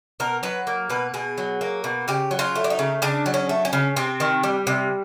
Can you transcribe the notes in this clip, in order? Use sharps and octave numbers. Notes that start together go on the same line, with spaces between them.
B2 A#4
F#3 B4
A#3
B2 B4
B2 G#4
F#3
A#3
B2
C#3 G4
F#3
F4
A3
D4
D#4
C#3
C#3 D4
F#3
C#4
A3
C#4
C#3
C3 C4
D#3
G3
C3